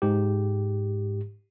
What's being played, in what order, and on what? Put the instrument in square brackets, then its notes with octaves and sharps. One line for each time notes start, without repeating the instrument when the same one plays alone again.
[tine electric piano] G#2 G4